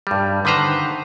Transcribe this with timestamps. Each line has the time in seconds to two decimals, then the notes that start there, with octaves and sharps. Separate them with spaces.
0.07 G2 G3
0.45 D3 D#3 B4 C5 A#5